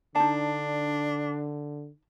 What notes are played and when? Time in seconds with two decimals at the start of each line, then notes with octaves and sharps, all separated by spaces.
0.15 D3 D4 D#4 A5